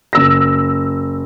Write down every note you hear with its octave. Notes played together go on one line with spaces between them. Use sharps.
F#1 E6 A#6